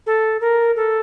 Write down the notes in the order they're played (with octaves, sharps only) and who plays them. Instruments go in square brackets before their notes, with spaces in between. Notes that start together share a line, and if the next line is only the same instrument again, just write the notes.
[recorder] A4
A#4
A4